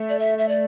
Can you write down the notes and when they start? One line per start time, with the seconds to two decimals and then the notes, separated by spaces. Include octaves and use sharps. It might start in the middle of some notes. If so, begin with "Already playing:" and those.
Already playing: A3
0.09 D5
0.19 E5
0.38 E5
0.48 D5